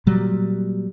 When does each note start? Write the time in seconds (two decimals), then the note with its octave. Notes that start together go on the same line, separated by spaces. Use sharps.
0.06 A#2 F#3 G3